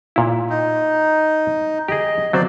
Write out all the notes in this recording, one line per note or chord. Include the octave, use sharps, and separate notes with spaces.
A#2 E4
D#4
G4 G#4 D#5
F2 F#3 C4 C5 D5